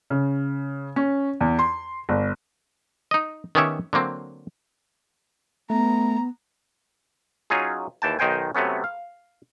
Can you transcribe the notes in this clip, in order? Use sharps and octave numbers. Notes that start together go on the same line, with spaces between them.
C#3
C#4
E2
C6
G1
D#4 D#5
D#3 B3 C#4 G4 C#5 E5
D3 F#3 A#3 C4
A3 B3 A#5
F#3 C#4 D#4 F4 G#4
D#2 E3 G5 A5
B1 D#3 D#4 C5 G5 G#5
C3 F#3 A3 B3 C#4
F5